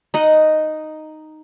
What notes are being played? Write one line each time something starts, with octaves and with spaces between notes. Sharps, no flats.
D#4 D#5 F#5